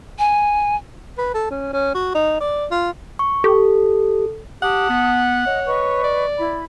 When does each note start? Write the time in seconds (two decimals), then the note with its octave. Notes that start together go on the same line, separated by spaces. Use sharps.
0.19 G#5
1.18 B4
1.35 A4
1.51 C#4
1.73 C#4
1.94 F#4
2.15 D#4
2.41 D5
2.71 F4
3.19 C#6
3.44 G4 A4
4.63 G4 F#5 A5 D#6
4.90 B3
5.46 C#5 D#5
5.66 B4 D#5 C#6
6.04 D5
6.38 E4 B5